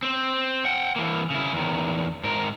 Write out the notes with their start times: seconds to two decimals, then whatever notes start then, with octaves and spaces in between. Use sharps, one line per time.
0.03 C4 C5
0.65 F#5 G5
0.96 E3 A#3
1.30 C#3 E4
1.53 E2 D#3
2.24 G#2 A#4